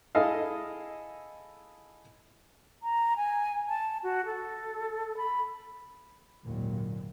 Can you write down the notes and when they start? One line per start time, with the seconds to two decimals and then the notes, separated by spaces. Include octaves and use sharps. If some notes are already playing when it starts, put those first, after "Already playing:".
0.15 E4 G#4 A4 D#5 F5
2.83 A#5
3.17 G#5
3.68 A5
4.03 F#4
4.25 A4
5.17 B5
6.44 G#1 D#2 A#2 D3 F#3